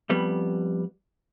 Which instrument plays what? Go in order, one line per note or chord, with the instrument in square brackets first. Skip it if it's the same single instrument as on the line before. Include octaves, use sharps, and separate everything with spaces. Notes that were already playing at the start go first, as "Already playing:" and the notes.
[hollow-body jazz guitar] F2 G3 B3